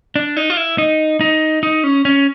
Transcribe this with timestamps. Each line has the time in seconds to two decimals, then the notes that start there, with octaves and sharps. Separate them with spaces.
0.16 D4
0.37 D#4
0.50 F4
0.57 E4
0.78 D#4
1.21 D#4
1.63 D#4
1.84 C#4
2.05 C#4